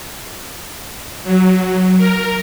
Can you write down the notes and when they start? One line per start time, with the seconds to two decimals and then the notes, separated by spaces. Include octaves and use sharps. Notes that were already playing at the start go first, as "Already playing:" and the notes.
1.24 F#3
1.98 A#4